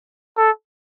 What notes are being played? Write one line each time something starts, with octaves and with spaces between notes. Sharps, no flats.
A4